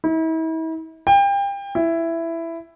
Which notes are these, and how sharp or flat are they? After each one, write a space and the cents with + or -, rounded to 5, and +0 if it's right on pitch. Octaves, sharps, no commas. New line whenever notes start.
E4 -40
G5 +30
E4 +10